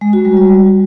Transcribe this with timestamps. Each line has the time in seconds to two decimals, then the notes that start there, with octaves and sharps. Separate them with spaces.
0.01 G#3
0.13 F#4
0.25 G3
0.37 G3